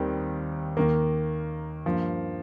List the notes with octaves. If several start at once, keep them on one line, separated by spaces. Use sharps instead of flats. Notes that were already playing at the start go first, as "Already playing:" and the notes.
Already playing: D#2 D#3 G3 C4 G4
D#2 D#3 A#3
G2 F3 A#3